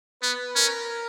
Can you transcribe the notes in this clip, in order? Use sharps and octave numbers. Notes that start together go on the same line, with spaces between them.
B3 B4
C#4 A#4